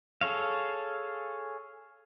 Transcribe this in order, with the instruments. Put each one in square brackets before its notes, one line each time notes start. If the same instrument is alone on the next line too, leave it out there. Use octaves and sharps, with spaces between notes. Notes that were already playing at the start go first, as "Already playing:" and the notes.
[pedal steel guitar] G#4 A4 C#5 F5